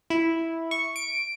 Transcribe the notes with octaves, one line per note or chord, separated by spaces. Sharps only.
E4
C#6
D7